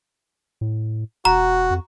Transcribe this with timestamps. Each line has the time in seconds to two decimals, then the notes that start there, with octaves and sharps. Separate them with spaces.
0.61 A2
1.25 E1 F#4 A#5
1.70 F2